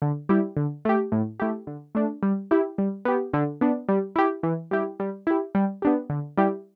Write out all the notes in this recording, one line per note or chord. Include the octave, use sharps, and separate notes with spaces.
D3
G3 E4 G4
D3
A3 G4
A2
A3 E4 G4
D3
A3 D4
G3
E4 G4
G3
B3 G4
D3
B3 D4
G3
E4 G4
E3
G3 E4 G4
G3
E4 G4
G3
B3 D4 G4
D3
G3 E4 G4